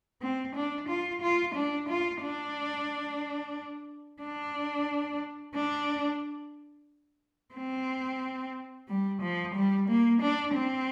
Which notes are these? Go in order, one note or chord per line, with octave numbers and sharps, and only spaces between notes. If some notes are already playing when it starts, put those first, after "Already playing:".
C4
D4
F4
F4
D4
F4
D4
D4
D4
C4
G3
F3
G3
A#3
D4
C4